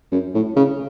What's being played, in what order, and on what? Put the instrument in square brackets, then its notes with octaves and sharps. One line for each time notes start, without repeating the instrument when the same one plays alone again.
[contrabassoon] F#2
A2
C#3